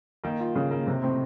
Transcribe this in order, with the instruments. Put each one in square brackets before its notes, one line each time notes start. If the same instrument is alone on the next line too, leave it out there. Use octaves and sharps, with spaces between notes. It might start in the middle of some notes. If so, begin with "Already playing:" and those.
[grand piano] D#3 [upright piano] A#3
[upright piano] F4
C#3
A#3
C3
[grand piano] A2 [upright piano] C4